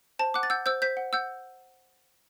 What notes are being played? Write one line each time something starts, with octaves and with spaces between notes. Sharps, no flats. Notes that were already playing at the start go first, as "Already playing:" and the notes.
C5 A5
F#5 D6 F#6
A6
F#5 E6 G6
C5 E6 G6
C5 G6 B6
F#5
F#5 E6 G6